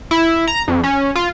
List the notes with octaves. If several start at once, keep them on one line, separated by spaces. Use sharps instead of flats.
E4
A#5
F2
C#4
F4